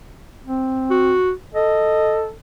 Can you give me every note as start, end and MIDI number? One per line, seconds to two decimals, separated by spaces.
0.47 1.14 60
0.90 1.32 66
1.55 2.31 69
1.55 2.24 75